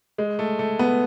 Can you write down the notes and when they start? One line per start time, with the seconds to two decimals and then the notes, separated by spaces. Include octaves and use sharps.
0.18 G#3
0.39 A3
0.59 A3
0.79 B3